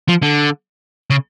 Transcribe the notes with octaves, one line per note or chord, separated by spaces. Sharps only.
F3
D3
C#3